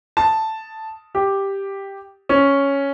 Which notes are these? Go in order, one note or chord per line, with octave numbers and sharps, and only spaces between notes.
A5
G4
C#4